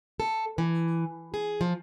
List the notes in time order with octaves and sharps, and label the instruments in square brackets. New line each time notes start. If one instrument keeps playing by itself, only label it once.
[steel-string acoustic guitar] A4
E3
G#4
F3